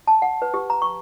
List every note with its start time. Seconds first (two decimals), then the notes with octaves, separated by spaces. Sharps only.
0.07 A5
0.22 F#5
0.42 B4
0.54 G4
0.70 A#5
0.82 C#6